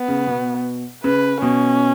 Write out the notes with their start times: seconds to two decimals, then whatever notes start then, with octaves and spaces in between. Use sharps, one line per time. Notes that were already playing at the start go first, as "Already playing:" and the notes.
Already playing: B3
0.08 C#3
0.27 B2
1.04 C#3 B4
1.42 B2 C#4